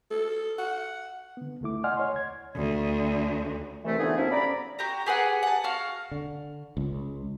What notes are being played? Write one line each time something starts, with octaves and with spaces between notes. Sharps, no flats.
A4
F#5
D3 B3
C#2 D3 A3 E4 D6
D5 D#5 F#5 G#5 C6 F6
C#5 C6
D2 G#6
D2
C2 E3 A3
D3 E3 F3 B3 D#4 G#4
F#2 C3 F3 B3 C#4 E4
D5 A#5 B5
F#4 G4 A#5
G4 G#4 B4 F#5
F#5 A5
F#4 F5 F6
D3
C#2